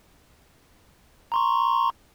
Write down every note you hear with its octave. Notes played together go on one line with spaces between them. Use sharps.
A#5 C6 C#6